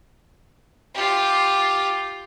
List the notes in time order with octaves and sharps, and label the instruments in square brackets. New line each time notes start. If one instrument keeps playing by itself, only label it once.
[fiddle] F4 G4